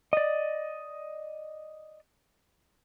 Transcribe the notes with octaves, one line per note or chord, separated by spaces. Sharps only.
D5 D#5